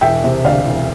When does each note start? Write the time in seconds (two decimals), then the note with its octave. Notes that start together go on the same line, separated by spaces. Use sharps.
0.01 E1 E5 G5
0.24 C3
0.44 D2 D5 F5
0.67 E1